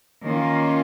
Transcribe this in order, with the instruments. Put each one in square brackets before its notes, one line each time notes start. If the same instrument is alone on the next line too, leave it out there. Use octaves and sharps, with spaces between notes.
[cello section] D#3 A#3 C#4 F4